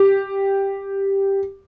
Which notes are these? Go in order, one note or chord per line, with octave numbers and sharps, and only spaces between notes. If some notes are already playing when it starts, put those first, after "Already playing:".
Already playing: G4